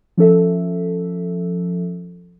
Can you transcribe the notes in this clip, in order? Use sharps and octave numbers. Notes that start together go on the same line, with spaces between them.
F3 C#4 A4 E5